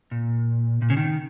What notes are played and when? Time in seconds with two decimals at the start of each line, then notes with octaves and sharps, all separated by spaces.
0.11 A#2
0.82 A#2
0.90 C#3
0.97 D#3